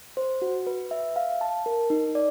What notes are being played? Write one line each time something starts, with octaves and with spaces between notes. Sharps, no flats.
C5
F#4
B4
E5
F5
A5
A#4
D#4
D5